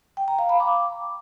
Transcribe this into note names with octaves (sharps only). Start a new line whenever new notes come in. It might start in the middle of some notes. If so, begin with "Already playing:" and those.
G5
A#5
F5
B5
D6